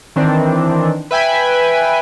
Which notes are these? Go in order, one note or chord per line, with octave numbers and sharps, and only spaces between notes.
D#3 E3 C4 D4
B4 E5 G5 G#5 B5